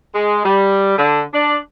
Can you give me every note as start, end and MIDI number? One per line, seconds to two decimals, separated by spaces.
0.14 0.40 56
0.44 0.97 55
0.98 1.22 50
1.32 1.56 62